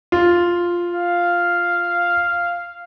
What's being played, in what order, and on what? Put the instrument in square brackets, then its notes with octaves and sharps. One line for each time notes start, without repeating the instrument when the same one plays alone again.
[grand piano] F4
[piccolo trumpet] F5